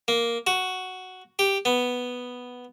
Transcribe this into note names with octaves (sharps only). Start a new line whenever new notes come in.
A#3
F#4
G4
B3